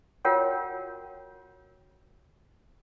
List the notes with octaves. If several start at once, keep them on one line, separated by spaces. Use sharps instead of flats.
F4 F#4 A#4 C#5 F#5 G5